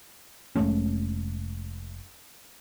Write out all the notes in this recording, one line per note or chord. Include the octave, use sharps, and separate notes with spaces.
F1 G#3 A3 C#4